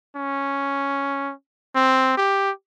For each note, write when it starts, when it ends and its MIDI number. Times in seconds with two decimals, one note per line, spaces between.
0.16 1.32 61
1.75 2.14 60
2.17 2.51 67